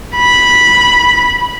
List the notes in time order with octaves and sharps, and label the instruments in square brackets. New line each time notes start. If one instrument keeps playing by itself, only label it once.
[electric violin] B5